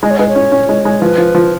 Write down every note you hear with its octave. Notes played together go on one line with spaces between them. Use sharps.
G#3 D#5
C#5
G#3 B4
C#5
C#4
C#4
G#3
G#3
F3 B4
F3
F3